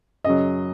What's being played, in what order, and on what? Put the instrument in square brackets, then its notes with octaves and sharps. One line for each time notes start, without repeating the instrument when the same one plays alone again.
[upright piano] F#2 C#3 F#3 D#5